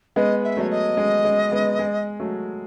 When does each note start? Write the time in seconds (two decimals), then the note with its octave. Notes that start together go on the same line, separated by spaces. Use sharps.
0.16 G#3 B3 D#5
0.44 E5
0.57 F#3 A3 C#5
0.70 D#5
0.97 G#3
1.25 G#3
1.52 G#3 B3
1.79 G#3
2.20 F#3 A3